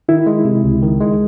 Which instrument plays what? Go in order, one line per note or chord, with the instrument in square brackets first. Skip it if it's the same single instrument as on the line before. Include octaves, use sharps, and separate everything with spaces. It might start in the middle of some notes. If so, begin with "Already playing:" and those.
[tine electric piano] D#3 [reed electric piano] E4
[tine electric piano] G#3
C3
C#2
D#3
G#3